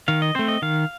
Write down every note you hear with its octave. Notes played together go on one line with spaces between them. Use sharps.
D#3 F5
D#5
A3 C4 C5
D#5
D#3 F5